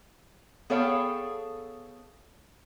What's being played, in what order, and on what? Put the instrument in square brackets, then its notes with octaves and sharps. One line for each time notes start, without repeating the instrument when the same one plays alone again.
[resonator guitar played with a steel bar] B3 G#4 A4 C#5 F5 G5